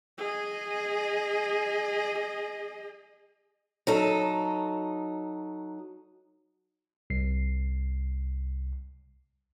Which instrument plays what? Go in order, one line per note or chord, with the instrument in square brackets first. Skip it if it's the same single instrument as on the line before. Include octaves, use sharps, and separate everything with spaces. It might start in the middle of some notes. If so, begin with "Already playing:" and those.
[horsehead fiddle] G#4 D#5
[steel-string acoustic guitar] F#3 D#4 A4
[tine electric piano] C2 C7